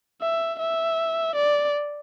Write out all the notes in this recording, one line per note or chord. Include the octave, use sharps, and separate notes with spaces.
E5
E5
D5